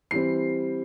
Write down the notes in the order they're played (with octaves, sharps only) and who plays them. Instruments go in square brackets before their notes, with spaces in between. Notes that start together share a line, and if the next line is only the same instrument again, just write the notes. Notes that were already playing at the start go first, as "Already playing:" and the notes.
[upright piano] E3 G3 C4 C7